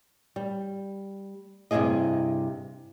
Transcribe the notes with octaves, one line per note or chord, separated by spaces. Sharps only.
G3
G2 C3 D#3 E4 G#4 D#5